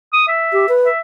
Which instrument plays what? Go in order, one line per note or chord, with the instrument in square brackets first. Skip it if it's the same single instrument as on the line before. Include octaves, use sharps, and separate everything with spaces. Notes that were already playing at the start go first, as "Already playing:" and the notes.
[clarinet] D#6
E5
[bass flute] G4
B4
[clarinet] E5